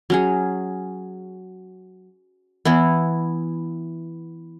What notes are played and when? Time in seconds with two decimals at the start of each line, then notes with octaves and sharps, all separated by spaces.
0.10 F#3 C#4 G#4
2.65 E3 B3 E4